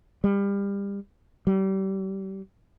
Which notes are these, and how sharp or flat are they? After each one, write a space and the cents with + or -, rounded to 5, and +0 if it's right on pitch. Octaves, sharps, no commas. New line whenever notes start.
G3 +30
G3 -30